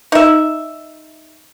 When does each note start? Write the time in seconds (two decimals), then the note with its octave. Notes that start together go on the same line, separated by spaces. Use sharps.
0.12 D#4 E5